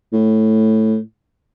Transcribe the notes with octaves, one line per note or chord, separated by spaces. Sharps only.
A2